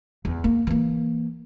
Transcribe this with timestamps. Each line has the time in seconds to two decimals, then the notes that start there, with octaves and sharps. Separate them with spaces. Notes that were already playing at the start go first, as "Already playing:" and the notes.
0.25 E2
0.44 A#3
0.67 E3 A#3